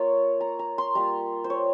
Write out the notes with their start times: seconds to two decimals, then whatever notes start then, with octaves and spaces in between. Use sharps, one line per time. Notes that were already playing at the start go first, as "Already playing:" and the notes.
Already playing: A#3 F4 C#5
0.41 A#5
0.59 A#5
0.78 C6
0.95 G3 A#3 F4 A#5
1.44 C5
1.50 C#5